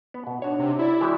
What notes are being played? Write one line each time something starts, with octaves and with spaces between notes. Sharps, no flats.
B3
B2
D4 D#4 F#4 C#5
C3
E4 D5
E3 G#3 F#4 G4